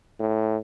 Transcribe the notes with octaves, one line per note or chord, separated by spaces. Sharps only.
A2